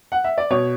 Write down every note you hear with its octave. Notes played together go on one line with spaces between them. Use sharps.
F#5
E5
D5
B2 C#5